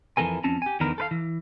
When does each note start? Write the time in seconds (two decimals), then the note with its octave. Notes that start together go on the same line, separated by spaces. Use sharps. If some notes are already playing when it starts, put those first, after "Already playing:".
0.17 F2 E3 D4 A4 A#4 G#5
0.44 F2 C4 C#4 A5
0.62 G4 G#5
0.80 E2 D3 D#3 B3 A#4
0.98 A4 B4 F5
1.11 E3